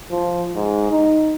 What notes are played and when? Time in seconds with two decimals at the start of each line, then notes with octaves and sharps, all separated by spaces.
0.11 F3
0.55 G#2
0.91 D#4